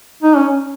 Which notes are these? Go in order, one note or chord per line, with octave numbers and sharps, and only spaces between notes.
D#4
C#4